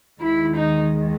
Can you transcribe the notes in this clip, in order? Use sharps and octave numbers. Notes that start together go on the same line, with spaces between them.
D#2 D#3 G#3 E4
D#4